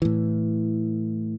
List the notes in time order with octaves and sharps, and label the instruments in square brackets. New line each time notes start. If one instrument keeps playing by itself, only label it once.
[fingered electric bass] A2 E3